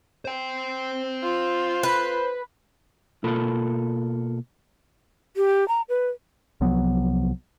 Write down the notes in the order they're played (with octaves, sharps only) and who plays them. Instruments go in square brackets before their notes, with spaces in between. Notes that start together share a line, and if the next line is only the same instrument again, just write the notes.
[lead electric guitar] C5 G5
[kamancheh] F4
[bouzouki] B4
[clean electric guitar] B2 A#3 F4 A4 A#4 B5
[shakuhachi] G4
A#5
B4
[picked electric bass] C2 F3 F#3 B3